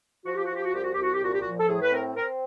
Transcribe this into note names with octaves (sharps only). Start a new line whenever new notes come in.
F3 F#4
G4
F3 F#4
G4
F#4
C2 G4
F#4
C2 G4
F#4
G4
A#2 F#4
G4
F#4
F3
A4
A2 G#4
B4
C4 A#4
C4 A#4